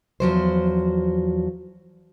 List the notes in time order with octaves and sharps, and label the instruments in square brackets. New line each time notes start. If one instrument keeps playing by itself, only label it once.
[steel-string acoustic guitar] E2 F3 F#3 C5